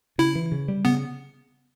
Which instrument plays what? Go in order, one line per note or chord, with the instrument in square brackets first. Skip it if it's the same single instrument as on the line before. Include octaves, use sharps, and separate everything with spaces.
[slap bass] C#3 [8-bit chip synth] E4
[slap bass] E3
C#3
G3
[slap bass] C#3 [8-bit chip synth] B3